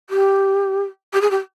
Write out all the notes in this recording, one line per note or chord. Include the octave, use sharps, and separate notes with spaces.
G4
G4
G#4
G4